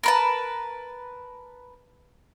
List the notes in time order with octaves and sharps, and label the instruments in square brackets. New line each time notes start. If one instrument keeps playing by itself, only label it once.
[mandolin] A#4 B4 A5